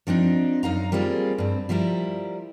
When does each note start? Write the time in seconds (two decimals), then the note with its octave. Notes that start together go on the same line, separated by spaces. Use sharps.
0.07 F3 C4 D4 D#4
0.63 F#2 D#4 F5 A#5
0.92 G3 A#3 C4 F4 G#4
1.38 G2 C4
1.69 F3 G3 E4 G4 A#4